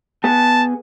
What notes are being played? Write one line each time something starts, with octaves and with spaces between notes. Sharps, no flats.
B3 G#4 A5